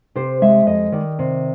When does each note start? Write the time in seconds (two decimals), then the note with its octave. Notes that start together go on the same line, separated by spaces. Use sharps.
0.15 C3 C5
0.42 G#3 E5
0.66 F2 D#5
0.92 D#3 D5
1.19 C3